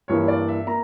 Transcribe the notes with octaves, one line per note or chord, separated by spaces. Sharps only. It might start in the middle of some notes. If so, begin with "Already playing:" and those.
G2 E3 A#3 C#5
D5
E5
A#3 A#5